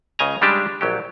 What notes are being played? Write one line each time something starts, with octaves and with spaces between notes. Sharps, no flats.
C#2 C#3 D#5 G#5 A#5
C#3 G3 G#3 D4 G4 A5
A#1 F#3 G4